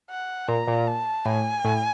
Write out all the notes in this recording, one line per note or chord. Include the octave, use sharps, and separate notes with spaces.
F#5
A#2 A#5
A#2
A5
A2 G#5
A2